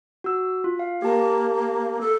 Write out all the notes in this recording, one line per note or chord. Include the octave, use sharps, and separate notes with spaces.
F#4 E6
F4
F5
A#3 G4 A5
A4